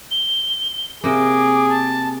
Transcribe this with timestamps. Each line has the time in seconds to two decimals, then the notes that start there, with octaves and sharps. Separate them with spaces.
0.11 G7
1.04 C3 A#3 G#4 D6
1.69 A5